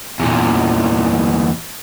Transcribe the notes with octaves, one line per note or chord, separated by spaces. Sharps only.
E2 A#2